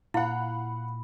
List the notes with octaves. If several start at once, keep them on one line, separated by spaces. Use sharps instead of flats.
A#2 E4 F5 F#5 B5